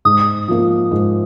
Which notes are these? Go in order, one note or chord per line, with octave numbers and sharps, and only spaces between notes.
G#2 D#6
F3 A#3
G#2